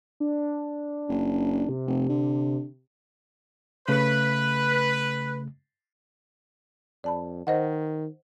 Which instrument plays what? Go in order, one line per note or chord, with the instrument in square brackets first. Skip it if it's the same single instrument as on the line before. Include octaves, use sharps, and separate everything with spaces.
[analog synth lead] D4
[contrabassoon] F#1
[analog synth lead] C3
[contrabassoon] F1
D3
[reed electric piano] C#3 A3 [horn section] B4
[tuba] F2 [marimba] D5 A5 B5
[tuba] D#3 [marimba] C5 D#5 F#5